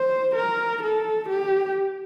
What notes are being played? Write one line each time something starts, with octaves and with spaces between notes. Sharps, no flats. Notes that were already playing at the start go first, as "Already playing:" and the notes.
Already playing: C5
A#4
A4
G4